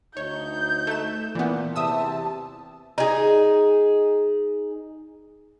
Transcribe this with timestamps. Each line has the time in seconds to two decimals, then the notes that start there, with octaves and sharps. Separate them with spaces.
0.17 D2 D#4 C#5 G6
0.87 A3 E7
1.35 A#2 E3 B3
1.76 E2 C3 E5 A5 D#6 E6
2.98 D#4 G#4